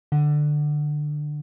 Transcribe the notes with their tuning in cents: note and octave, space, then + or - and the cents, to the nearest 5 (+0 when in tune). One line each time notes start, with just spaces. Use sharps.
D3 +15